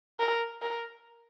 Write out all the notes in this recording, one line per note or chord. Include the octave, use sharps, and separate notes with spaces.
A#4
A#4